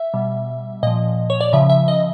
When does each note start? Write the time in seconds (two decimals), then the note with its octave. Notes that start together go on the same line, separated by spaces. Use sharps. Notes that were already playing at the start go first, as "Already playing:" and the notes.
Already playing: E5
0.14 B2 G3
0.83 A#2 F3 D#5
1.30 C#5
1.41 D5
1.53 C#3 F3 E5
1.70 E5
1.88 D#5